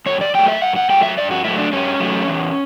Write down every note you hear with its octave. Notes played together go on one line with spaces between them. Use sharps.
G2 C#5
D5
F#3 A3 G5
E5
G2 F#5
F#5
F#3 A3 G5
E5
G2 D5
F#4
F#3 A3 E4
D4
G2 C#4
F#3 A3
E2